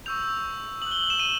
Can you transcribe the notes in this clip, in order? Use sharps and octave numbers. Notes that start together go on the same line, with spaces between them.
C#6 E6 G6 F7
D#6 F#6 F#7
G7
F#7
E7
D#7